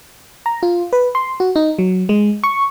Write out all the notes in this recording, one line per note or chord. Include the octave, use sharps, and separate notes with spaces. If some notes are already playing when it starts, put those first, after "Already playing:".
A#5
F4
B4
C6
F#4
D#4
F#3
G#3
C#6